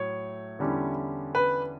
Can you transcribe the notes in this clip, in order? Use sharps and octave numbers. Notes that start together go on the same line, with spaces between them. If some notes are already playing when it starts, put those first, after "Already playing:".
Already playing: A2 F#3 C#5
E2 D3 G3 C#4 E4
B4